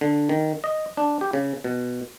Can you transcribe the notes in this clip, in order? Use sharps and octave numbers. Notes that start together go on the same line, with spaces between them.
D3
D#3
D#5
D4
G4
C#3
B2